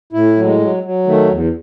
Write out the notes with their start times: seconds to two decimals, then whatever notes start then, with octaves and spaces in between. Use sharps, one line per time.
0.13 A2 E4
0.36 F#3
0.44 G#3
0.60 F#3
0.83 F#3
1.07 D#3 A3
1.29 E2